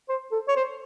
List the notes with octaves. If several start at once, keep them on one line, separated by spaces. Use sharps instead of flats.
C5
A4
C#5
C5